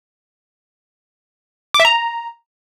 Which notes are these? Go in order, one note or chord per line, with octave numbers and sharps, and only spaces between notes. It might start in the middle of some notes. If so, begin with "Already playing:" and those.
D6
E5
A#5